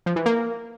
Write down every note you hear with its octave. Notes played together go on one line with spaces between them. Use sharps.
F3
E3
A#3